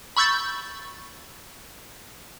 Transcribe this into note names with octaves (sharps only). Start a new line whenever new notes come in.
B5 C#6 E6 G6 A6